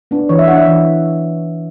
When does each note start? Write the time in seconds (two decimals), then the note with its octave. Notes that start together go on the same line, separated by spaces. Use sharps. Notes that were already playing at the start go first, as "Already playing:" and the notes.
0.11 B3 D4
0.29 E3 C#5
0.39 E5
0.48 B3 D4 F#5
0.57 E5
0.67 E3